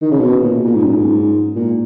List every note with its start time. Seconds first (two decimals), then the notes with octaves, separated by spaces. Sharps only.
0.02 D#3
0.11 C#3
0.20 B2
0.42 A#2
0.65 A#2
0.75 G#2
0.84 F#2
0.94 G#2
1.56 A#2